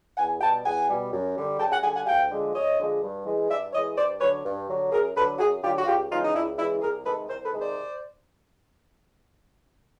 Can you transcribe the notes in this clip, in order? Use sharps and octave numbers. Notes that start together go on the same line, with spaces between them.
E2 F#5 G#5
B2 G3 G5 A5
E2 F#5 G#5
B2 G3
F#2
D3 G3
F#2 G5 A5
F#5 G#5
D3 G3 F#5 G#5
F#5 G#5
D2 F5 G5
D3 F3 G#3
D2 C#5 D#5
D3 F3 G#3
G2
E3 G#3
G2 D5 E5
E3 G#3 C#5 D#5
G2 C5 D5
D3 F#3 B4 C#5
G2
D3 F#3
F#2 G#4 A#4
D3 F#3 A4 B4
F#2 F#4 G#4
D3 F#3 F4 G4
F#4
C#2 F4 G4
C#3 E3 G#3 D#4 F4
D#4
C#2 D4 E4
C#3 E3 G#3 D4 E4
C2 G#4 A#4
C3 D#3 G#3 A4 B4
C2 A#4 C5
A4 B4
C3 D#3 G#3
C5 D5